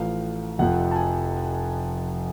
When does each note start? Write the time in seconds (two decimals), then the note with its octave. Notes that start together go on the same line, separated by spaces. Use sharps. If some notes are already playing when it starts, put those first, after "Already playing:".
Already playing: A1 A2 F3 F5
0.59 F1 F2 F3 F#5
0.91 A5
0.96 G#5